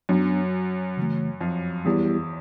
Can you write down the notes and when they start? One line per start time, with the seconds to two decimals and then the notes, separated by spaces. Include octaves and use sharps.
0.09 F#2 F#3 B3 D4
0.97 C#3 E3 A3
1.41 F2
1.85 E2 G3 B3 E4 G4